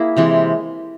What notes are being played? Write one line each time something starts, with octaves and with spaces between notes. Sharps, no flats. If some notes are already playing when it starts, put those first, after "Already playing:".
Already playing: A#3 E4 G#4
C3 E3 G#3